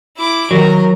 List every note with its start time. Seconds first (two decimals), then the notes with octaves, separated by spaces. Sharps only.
0.17 E4 D6
0.51 D#3 F#3 A#4